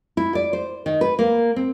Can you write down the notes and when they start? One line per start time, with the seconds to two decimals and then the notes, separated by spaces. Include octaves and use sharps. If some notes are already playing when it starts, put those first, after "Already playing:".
0.17 E4
0.35 D5
0.53 C5
0.86 D#3
1.01 B4
1.19 A#3
1.56 C4